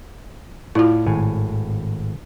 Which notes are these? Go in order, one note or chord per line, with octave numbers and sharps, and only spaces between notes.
A2 E4 F4 D5 F5
G#1 A2 G#5